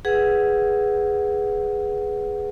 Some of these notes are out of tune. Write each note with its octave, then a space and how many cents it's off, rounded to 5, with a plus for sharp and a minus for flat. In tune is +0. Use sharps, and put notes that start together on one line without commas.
G#4 +0 B4 +0 F#5 +0